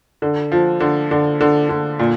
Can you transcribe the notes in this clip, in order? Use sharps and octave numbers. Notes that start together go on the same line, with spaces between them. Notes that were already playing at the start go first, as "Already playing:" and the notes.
D3
F3
D3
D3
D3
D3
A#2